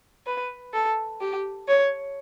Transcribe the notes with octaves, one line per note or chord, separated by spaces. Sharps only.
B4
A4
G4
C#5